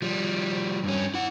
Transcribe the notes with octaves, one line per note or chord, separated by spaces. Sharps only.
F3 G3
G2 C#4
E4 F#5